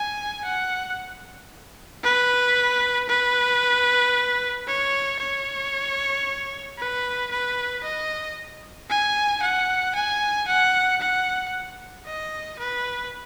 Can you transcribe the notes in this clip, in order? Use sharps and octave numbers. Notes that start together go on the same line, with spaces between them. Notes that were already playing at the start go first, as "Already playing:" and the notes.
Already playing: G#5
F#5
B4
B4
C#5
C#5
B4
B4
D#5
G#5
F#5
G#5
F#5
F#5
D#5
B4